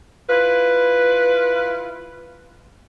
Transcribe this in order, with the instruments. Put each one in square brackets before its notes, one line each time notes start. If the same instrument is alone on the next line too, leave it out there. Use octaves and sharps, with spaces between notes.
[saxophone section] E4 F4 B4